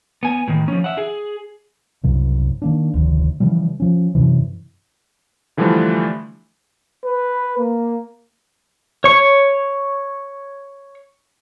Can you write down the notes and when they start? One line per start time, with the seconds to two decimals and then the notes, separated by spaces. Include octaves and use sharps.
0.23 B3 G#5
0.48 A2 D#3
0.68 F3 C#4
0.84 E5 F#5
0.98 G#4
2.04 C2 F#2 C#3
2.62 D#3 A#3 D4
2.93 F1 D2 D#3
3.40 C#3 E3 F3 G3
3.80 F3 C#4
4.15 F#2 A2 C3 E3
5.57 D3 E3 F3 G3 A3 D4
7.05 B4
7.58 A#3
9.04 C#5 C#6